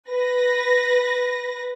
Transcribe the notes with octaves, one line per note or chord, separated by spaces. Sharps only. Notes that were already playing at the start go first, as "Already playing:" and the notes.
B4 A#6